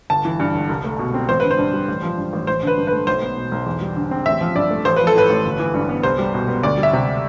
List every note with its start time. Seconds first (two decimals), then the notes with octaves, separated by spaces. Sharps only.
0.10 G1 A5
0.25 E3
0.40 G2
0.55 G1
0.69 C2
0.84 A3
0.99 B2
1.14 C4
1.29 A1 C5
1.40 D3 B4
1.51 C5
1.58 G2
1.73 G3
1.88 A1
2.03 F3
2.18 G2
2.33 A1
2.47 A1 C5
2.63 D3 B4
2.77 G2
2.87 A3 B4
3.07 B1 C5
3.22 B3
3.36 B2
3.51 B1
3.66 E2
3.81 G3
3.96 D3
4.11 C4
4.26 A1 E5
4.41 F3
4.55 G2 D5
4.71 A3
4.85 A1 C5
4.96 F3 B4
5.07 A4
5.15 A2 B4
5.30 A1
5.45 G1
5.59 E3
5.74 G2
5.89 B3
6.03 C2 C5
6.19 G3
6.34 B2
6.48 B3
6.63 D2 D5
6.78 G3
6.83 E5
6.93 C3